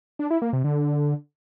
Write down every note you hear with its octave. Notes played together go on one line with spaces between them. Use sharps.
D4
E4
A#3
C3
D3